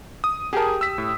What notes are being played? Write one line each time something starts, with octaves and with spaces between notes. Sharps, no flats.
D#6
G4 G#4 A#4 A5
E6 B6
A2